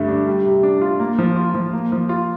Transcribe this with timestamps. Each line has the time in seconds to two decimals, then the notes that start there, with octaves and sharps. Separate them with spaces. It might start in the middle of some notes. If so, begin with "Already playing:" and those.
Already playing: G2 D3 A3
0.08 D4
0.27 G3
0.46 C3
0.63 D4
0.81 F4
1.00 A#3
1.19 F3
1.36 F4
1.54 F3
1.73 A#3
1.92 F3
2.09 F4